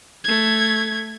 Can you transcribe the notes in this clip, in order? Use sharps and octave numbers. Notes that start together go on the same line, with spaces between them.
A3 G#6